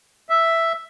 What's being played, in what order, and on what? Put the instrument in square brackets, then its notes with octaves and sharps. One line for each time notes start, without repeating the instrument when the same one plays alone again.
[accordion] E5